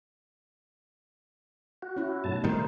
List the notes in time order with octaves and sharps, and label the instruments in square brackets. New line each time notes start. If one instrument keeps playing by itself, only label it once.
[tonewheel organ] F#4
[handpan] C#4 E4
[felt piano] B1 A2 [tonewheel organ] F#3 A5
[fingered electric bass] A2 D#3 G3 [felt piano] C3 [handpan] A#4 [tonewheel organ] C5